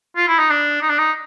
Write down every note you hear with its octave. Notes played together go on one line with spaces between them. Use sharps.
F4
E4
D#4
D4
D#4
D4
D#4